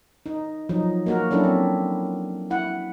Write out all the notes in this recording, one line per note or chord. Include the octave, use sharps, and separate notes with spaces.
D#4
F3 F#3 D#4
A#3 F#4 A#4
F#3 C#4 D4 E4 A4
C4
E4 F#5